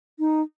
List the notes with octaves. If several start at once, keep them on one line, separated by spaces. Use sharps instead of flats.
D#4